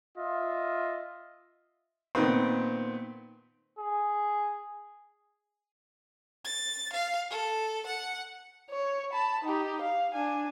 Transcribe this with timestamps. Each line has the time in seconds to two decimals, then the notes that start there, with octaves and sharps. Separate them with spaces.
0.18 F4 D#5 E5
2.15 A#2 D#3 B3 C4
3.79 G#4
6.45 A6
6.93 F5
7.31 A4
7.86 F#5
8.70 C#5
9.12 A5 B5
9.44 D#4 G4
9.81 F5
10.14 D4 G#5